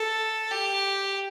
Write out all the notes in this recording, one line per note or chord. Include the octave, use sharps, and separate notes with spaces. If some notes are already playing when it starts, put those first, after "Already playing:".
Already playing: A4
G4